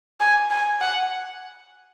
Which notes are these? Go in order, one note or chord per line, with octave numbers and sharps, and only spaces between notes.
G#5
G#5
F#5